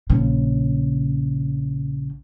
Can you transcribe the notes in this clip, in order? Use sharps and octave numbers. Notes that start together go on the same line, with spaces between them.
A#1 C#3